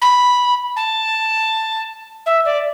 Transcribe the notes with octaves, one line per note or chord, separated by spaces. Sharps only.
B5
A5
E5
D5